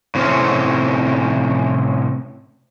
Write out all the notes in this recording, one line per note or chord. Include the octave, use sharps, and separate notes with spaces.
A2 C3 C4 C#4